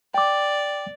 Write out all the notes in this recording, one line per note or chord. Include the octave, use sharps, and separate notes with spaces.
D5 G5 D6